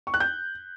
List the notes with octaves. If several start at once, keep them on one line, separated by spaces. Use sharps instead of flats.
C#6
F#6
G6